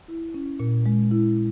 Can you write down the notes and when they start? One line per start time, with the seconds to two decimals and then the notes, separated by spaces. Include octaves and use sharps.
0.08 E4
0.34 C#4
0.60 A#2
0.86 G#3
1.11 E4